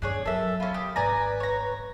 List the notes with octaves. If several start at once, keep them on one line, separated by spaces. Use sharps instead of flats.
E2 G2 D4 G#4 C#5
F#3 A4 A#4 E5
C#4 F4 B5
G4 D#6
G#1 B4 D5 G#5 A#5
C#5 A#5